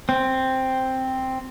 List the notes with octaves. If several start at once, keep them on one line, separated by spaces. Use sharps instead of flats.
C4